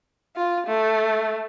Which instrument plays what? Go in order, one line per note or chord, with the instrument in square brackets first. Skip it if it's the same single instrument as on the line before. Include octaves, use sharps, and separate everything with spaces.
[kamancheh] F4
A3